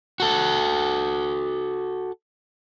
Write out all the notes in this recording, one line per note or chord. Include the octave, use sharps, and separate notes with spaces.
F#4 A4